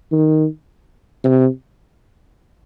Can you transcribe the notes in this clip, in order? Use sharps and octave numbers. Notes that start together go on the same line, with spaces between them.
D#3
C3